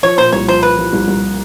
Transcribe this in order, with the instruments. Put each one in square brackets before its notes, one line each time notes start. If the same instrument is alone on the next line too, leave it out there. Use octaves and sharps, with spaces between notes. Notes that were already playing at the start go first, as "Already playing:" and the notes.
[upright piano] F3 [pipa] C#5
[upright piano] A#2 [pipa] C5
[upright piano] C2 [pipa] C#5
[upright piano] F3 [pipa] C5
[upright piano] F3 [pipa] B4
[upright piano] F3
C2
C2